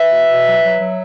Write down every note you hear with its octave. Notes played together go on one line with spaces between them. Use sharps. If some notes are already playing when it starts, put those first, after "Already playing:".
Already playing: B4 E5
B2
B2
F#3
F#3
F#3